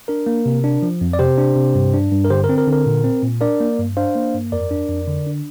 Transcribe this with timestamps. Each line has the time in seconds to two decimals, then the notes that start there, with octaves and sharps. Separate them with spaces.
0.08 D4 A#4
0.26 A#3
0.46 C3
0.64 D4
0.82 F3
1.01 F2
1.13 D5
1.19 C3 G4 C5
1.38 D4
1.56 C3
1.75 G2
1.94 D4
2.12 G2
2.25 A#4
2.30 D3 G4 C5
2.44 A#4
2.49 C4
2.58 A#4
2.67 D3
2.73 A#4
2.86 A#2
3.04 C4
3.22 A#2
3.41 D4 A#4 D5
3.60 A#3
3.79 G2
3.97 D4 C5 F5
4.15 A#3
4.34 G2
4.52 F2 A#4 D5
4.71 D4
4.89 F2
5.07 D3
5.27 D4